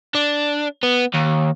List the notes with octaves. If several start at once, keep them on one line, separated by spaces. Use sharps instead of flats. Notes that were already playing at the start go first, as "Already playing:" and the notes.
D4
B3
D#2